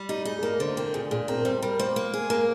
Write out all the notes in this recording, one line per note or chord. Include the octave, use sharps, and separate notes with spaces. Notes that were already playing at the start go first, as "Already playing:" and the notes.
Already playing: G3
D#4 G4
D#4 G#4
G#4
A#3 A#4
D3 C5
C4 A#4
A#2 G#4
A#2 G#4
C4 A#4
A#4
G3 C5
G3 A#4
A#3 C5
A#3
G#4
A#3 A#4